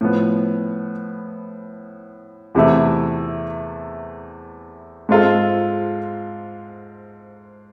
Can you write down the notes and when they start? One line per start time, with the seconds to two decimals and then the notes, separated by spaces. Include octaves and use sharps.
0.01 A2 F3 B3
2.55 E2 C3 E3 A3 E4
5.09 G#2 G#3 C4 F4 A4